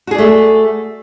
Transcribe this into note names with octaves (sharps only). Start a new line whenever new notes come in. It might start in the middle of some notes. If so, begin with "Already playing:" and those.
A3 F#4 G#4 D5